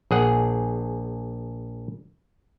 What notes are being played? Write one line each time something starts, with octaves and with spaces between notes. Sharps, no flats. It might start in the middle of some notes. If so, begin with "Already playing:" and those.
A#1 G#4 F#5